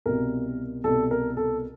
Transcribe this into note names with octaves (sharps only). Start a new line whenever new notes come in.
C2 B2 A#4
C2 B2 A4
A#4
A4